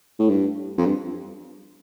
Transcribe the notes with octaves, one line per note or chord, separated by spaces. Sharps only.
A2
G2
F2
G2